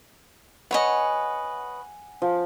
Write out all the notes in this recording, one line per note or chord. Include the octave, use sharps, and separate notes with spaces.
B4 C#5 D#5 F#5 G#5
F3